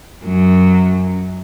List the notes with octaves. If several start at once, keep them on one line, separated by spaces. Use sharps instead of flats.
F#2 F#3